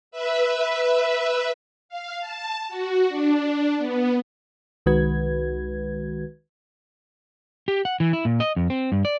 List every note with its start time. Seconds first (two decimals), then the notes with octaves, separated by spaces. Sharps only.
0.11 B4 E5
1.89 F5
2.20 A5
2.69 F#4
3.09 D4
3.77 B3
4.86 C2 D#3 G#3 F#4 B4 G#6
7.68 G4
7.85 F#5
8.00 E3
8.13 E4
8.25 A#2
8.40 D#5
8.56 F2
8.70 C4
8.92 G2
9.05 D5